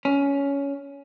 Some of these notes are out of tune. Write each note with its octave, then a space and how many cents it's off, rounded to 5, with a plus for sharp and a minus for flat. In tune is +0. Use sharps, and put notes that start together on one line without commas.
C#4 +15